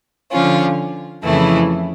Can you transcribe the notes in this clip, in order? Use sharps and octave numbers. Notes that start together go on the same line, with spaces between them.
D3 F3 C#4 F4
F2 C#3 E3 A3 E4